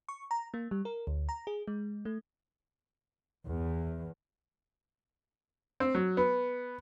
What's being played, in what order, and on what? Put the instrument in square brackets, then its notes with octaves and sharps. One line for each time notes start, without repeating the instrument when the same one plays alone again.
[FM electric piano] C#6
A#5
A#3
G3
A#4
D2
A#5
G#4
G#3
A3
[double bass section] E2
[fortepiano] C4
F#3
B3